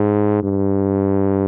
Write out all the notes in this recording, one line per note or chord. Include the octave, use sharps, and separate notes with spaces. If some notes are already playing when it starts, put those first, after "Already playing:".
Already playing: G#2
G2